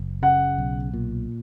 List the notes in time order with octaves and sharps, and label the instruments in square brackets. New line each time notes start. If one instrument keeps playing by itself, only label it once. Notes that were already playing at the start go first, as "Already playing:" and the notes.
Already playing: [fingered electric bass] F#1
[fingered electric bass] C#3 [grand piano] F#5
[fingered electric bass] B1
A#2